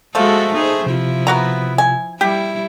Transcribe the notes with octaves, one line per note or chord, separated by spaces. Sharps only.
F3 G#3 A3 F#4 A4
D#4 G#4 C5
C3 F3 E4 F4
B3 F#4 A#5
G#5
G3 E4 G4